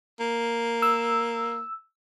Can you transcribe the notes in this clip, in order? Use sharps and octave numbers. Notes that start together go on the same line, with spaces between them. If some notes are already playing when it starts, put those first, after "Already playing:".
A#3
E6